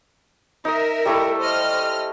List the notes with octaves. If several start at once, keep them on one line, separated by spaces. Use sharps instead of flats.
D#4 A#4 D#5 E5
G3 A3 E4
C5 D#5 F6